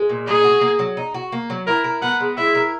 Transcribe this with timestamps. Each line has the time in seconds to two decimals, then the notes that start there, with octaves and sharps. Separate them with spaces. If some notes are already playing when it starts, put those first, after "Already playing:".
Already playing: G#3
0.09 A#2
0.27 D#4 G#4
0.44 F#4
0.61 A#3
0.79 F#3
0.97 D#4
1.14 F#4
1.32 A#3
1.50 F#3
1.67 E4 A#4
1.84 A#4
2.02 B3 F#5
2.20 G#3
2.38 E4 E5
2.55 A#4